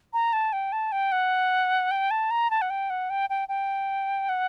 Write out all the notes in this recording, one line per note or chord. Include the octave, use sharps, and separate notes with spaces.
A#5
A5
G5
A5
G5
F#5
G5
A5
A#5
A5
F#5
G5
F#5
G5
G5
G5
F#5